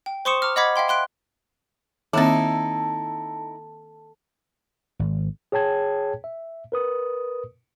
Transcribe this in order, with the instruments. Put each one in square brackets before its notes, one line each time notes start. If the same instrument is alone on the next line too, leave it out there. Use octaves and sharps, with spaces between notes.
[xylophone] G5
C5 C6 C#6 D#6 C#7 E7
A#5 D6 F6
D#5 F#5 B5 D6 G#6 B6
E5 F5 G5 C6
G5 C6 F#6 D7
[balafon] D#3 A#3 C4 [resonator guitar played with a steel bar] D#4 E4 [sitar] A4
[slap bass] G#1
[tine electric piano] G#4 C#5 G5 A5 G#6
E5
A#4 B4 D#6